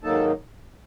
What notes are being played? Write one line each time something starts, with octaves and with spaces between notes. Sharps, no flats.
G#2 D#3 F#3 A#3 D#4 A4 A5